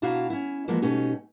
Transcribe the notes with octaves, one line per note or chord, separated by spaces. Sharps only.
B2 D4 E4 F#4 F5 A#5
C#4 E4
E3 F3 G#3 A#3 B3
B2 A3 C#4 D#4 G4